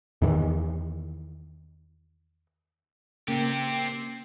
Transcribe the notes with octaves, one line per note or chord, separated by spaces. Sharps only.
E2 D#3 E3
C#3 A#3 C4 G4